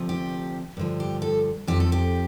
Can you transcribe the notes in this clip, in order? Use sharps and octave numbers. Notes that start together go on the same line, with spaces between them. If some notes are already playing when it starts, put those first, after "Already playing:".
Already playing: D2 C3 F3
G4
G2 D3 F3
G4
A4
F2 F3 G4
A4
G4